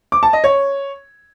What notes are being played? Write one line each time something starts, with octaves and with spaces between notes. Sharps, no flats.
D6
A5
D#5
C#5